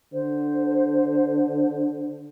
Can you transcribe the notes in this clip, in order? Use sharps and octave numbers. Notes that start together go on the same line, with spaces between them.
D3 C5